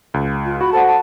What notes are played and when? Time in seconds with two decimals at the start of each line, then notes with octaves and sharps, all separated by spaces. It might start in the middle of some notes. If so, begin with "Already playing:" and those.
0.14 C#2
0.45 F4
0.61 F#4 B5
0.72 A4 C5 F#5 A5
0.87 A5